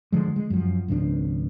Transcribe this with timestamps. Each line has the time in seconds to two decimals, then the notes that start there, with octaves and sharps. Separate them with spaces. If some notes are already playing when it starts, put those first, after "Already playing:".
0.12 D3 F3 G#3
0.36 G#3
0.50 F#2 F3
0.88 G#1 C#2 F3 D4